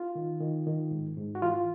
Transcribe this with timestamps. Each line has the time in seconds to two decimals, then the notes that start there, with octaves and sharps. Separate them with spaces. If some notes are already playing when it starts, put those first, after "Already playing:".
Already playing: F4
0.15 D#3
0.41 D#3
0.67 D#3
0.91 G#2
1.17 G#2
1.35 F#4
1.42 E3 F4